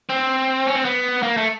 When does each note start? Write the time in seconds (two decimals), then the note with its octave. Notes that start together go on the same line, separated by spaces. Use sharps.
0.09 C4
0.66 C#4
0.75 C4
0.85 B3
1.23 A#3
1.37 A3